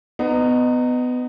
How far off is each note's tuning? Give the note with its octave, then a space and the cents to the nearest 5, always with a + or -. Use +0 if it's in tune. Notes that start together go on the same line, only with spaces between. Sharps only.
B3 +20 D#4 -20